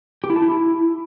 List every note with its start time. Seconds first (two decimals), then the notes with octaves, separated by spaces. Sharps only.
0.24 G4
0.30 E4
0.36 A5
0.42 E4